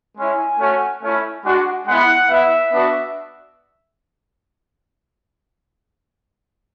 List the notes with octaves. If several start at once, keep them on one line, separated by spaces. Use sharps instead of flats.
G#3 C#4 E4 G#5
A3 C#4 F#4
A3 C#4 E4
G#3 D4 F#4
G#3 B3 E4 F#5
B3 E4 E5
B3 D4 F#4